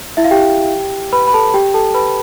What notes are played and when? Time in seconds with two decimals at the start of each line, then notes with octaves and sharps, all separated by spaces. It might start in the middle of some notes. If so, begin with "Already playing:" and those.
0.17 E4 E5
0.24 F5
0.31 G4 G5
1.13 B4 B5
1.27 B5
1.34 A4 A5
1.54 G4 G5
1.74 A4 A5
1.94 B4 B5